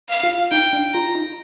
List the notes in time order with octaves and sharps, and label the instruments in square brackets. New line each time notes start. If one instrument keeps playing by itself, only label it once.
[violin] F5
[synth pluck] F4
[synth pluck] D#4 [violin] G5
[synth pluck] D4
[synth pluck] F4 [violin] A#5
[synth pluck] D#4